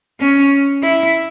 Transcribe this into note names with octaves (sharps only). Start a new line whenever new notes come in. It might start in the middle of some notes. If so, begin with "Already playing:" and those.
C#4
E4